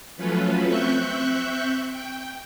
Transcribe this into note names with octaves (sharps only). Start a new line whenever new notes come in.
F3 F#3 A3 C#4 F4 B4
C4 E5 C#6 F#6 G6
G5